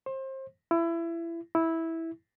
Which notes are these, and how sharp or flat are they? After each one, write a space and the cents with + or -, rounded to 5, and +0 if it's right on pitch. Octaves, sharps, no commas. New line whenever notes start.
C5 +30
E4 +25
E4 -10